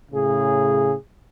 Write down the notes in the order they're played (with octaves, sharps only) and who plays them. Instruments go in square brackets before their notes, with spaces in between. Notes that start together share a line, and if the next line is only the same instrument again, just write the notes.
[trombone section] A2 C#3 G#4